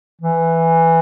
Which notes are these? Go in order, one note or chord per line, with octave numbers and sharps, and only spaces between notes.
E3